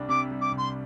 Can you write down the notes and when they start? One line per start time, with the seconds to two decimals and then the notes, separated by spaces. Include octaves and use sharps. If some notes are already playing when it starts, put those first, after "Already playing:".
Already playing: C2 G3 D4
0.09 C3 D6
0.31 G3
0.41 D6
0.52 C2
0.57 C6